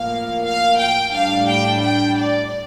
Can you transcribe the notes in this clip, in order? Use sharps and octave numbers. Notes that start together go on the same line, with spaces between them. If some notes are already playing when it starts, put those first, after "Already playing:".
Already playing: A2 F3 A#3 F5
F5
G5
A2 G3 D4 F5
G5
G5
D5